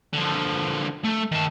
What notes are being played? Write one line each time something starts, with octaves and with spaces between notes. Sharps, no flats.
D3 F3
A3
D#3 A5